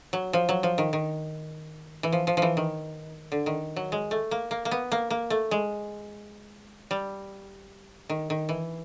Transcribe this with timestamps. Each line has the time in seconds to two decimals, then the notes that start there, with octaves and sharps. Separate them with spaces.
0.13 F#3
0.33 F3
0.49 F#3
0.63 F3
0.78 D#3
0.93 D#3
2.03 E3
2.12 F3
2.27 F3
2.37 F3
2.42 E3
2.57 D#3
3.32 D3
3.46 D#3
3.76 F#3
3.92 G#3
4.11 A3
4.31 A#3
4.51 A#3
4.65 A#3
4.71 B3
4.92 A#3
5.10 A#3
5.30 A3
5.51 G#3
6.91 G3
8.10 D#3
8.30 D#3
8.49 E3